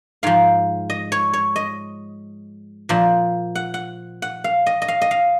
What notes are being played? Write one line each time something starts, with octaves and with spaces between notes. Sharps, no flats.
G#2 F3 F5
D#5
C#5
C#5
D#5
A#2 F3
F#5
F#5
F#5
F5
D#5
D#5
F5
D#5
F5